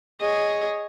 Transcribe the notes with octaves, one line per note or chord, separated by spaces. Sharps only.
G#4 C#5 D#5